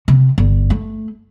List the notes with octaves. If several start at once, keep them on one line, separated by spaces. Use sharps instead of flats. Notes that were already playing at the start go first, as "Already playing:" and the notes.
C3
G1
A3